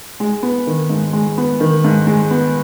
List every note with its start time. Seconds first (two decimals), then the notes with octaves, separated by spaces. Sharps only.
0.20 G#3
0.43 B3
0.67 D#3
0.90 G#2
1.13 G#3
1.38 B3
1.60 D#3
1.84 G#2
2.07 G#3
2.31 B3